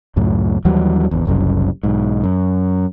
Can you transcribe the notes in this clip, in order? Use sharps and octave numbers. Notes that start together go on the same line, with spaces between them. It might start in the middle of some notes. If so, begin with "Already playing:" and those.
C#2 F#2 A2
D#2 E3 F#3 G3
G#1 E2
F#1 C2 F#2
B1 G#2
F#2